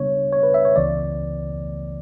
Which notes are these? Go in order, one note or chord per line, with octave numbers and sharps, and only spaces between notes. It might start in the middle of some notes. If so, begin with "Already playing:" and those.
Already playing: C#3 G3 B3 D4 C#5
C#5
B4
E5
C#5
C#2 C#3 E3 B3 D5